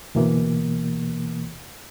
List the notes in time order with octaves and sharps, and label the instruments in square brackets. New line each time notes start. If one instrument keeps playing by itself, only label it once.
[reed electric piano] D2 B2 E3 A#3